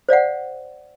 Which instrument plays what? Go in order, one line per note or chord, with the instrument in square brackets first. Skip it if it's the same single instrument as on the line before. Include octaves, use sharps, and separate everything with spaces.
[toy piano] C5 D5 F5 F#5